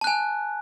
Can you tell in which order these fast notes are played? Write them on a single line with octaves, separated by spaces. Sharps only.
A5 F#6 G#5